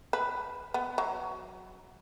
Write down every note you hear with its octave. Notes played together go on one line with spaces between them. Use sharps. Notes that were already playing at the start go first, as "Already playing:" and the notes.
B4
B3
F#3